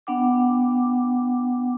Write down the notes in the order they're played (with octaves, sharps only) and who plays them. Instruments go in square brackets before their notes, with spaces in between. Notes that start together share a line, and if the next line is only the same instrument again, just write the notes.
[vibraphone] B3 D4 F#5 G5 D6